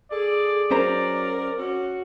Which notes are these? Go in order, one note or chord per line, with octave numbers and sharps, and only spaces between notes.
G#4 A4 D5
F#3 C#4 A#4 C5 A#5
C#4 F#4